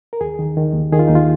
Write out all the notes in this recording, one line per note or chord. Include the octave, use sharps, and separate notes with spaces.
A#4
D#2 G#4
D#3
D#3
D#2
D#3 G#4
F4
D#2 D#4
F4